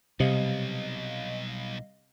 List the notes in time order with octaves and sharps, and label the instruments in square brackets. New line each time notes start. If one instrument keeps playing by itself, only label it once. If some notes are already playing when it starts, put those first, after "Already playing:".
[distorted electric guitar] B1 [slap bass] C3 [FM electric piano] G3 D#5 F5